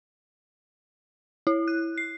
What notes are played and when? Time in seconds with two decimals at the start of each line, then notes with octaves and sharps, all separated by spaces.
1.47 E4
1.68 F#6
1.98 C7